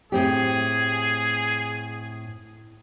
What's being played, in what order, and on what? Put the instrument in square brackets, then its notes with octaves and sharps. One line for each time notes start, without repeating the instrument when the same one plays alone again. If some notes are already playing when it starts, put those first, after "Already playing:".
[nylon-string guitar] A2 C4 G4 [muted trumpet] G#4